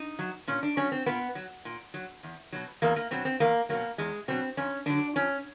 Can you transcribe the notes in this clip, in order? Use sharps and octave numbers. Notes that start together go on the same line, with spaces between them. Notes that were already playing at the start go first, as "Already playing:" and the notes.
Already playing: D#4
F#3
A#2 C#4
D4
F#3 C#4
C4
A#2 B3
F#3
A#2
F#3
E2
B2 F#3
E2 A#3
A#3
B2 F#3 C4
C4
E2 A#3
B2 F#3 A#3
E2 G#3
B2 F#3 C4
F2 C#4
D3 F#3 D4
F2 C#4